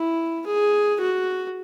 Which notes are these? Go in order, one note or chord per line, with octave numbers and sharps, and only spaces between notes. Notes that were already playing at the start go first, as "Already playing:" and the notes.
Already playing: E4
G#4
F#4